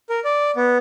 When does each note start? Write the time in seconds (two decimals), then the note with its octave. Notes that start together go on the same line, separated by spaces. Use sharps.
0.10 A#4
0.24 D5
0.56 B3